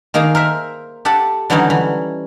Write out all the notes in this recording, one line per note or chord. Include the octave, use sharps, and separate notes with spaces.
D#3 A#3 D#4 G#4
A#4 C5 E5
G4 A4 F#5 A5
D3 E3 F#3 G3 C#4 D#4
E3